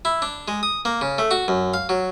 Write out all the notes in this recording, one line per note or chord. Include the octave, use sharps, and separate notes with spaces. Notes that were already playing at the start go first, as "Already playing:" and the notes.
E4
D4
G#3
D#6
A#3
C#3
A3
F#4
F#2
F5
F#3